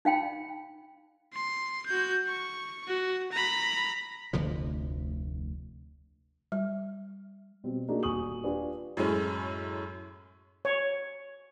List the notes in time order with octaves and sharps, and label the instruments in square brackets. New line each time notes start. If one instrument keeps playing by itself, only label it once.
[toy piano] D#4 F5 G5 B5
[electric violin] C6
F#4 G6
C#6
F#4
A#5 B5
[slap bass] F1 D2 D3 F3
[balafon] G3
[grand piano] B2 G3 C4
A3 A#3 D4 D#4 F#4 G#4
D#1 F#4 G#5 C#6 D#6 F#7
D4 F4 G4 B4 G#5
[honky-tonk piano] F#2 A2 G#3 C#4
[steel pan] C#5